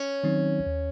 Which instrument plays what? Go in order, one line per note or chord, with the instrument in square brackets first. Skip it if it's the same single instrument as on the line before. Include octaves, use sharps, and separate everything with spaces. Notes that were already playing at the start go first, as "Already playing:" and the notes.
Already playing: [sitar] C#4
[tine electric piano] D#3 F#3 C4 D#4
D#2